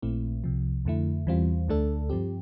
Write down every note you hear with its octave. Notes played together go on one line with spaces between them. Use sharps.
A#1 A#2 A3 C4 E4
C2 C3 F3
F2 D3 A3 E4
E2 E3 G3 C4 F4
D2 D3 A3 D4 A4
G2 F3 C4 G4